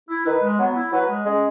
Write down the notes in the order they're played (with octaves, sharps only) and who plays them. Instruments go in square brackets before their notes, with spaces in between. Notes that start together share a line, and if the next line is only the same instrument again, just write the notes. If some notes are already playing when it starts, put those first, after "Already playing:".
[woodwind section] E4
[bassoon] D#3 [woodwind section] B4
[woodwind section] G#3
[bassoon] F#3 [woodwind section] B3
[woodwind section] E4
[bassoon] F#3 [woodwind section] B4
[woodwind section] G#3
[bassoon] G#3 [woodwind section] C#4